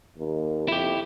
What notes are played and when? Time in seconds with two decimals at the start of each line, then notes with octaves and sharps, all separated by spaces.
0.18 D#2
0.68 F2 E4 G4